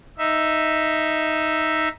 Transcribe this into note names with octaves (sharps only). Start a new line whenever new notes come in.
D#4 E5